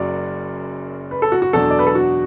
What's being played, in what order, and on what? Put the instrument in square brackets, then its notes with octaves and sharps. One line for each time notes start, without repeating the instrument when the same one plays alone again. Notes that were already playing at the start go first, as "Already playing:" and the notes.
Already playing: [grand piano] F#1 F#2 F#3 [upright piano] D5
[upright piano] B4
A4
F#4
F#4
[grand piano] E2 B2 F#3 D4 [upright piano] A4
[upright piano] D5
B4
A4
F#4